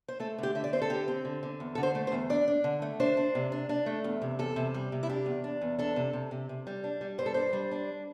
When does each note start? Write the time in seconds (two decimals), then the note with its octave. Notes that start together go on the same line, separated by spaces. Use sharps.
0.08 C5
0.20 A3 A4
0.38 D3 G4
0.55 D3 E5
0.64 D5
0.73 C4 C5
0.82 A4
0.90 D3 G4
1.08 C4
1.25 D3
1.43 D3
1.60 E2
1.75 D3 A4
1.83 C5
1.95 A3
2.07 C5
2.12 E2
2.30 D4 D5
2.48 D4
2.64 D3
2.82 A3
3.00 D4 C5
3.17 D4
3.35 C3
3.52 D4
3.69 D4
3.86 A3
4.04 E2
4.22 C3
4.39 E2 A4
4.56 C3
4.74 G3
4.92 C3
5.03 E4
5.09 D4 G4
5.26 E2
5.44 D4
5.61 E2
5.79 D4 A4
5.96 C3
6.13 C3
6.31 C3
6.49 C3
6.67 G3
6.84 D4
7.01 G3
7.18 G2 C5
7.26 A4
7.34 D4 C5
7.53 G3
7.71 D4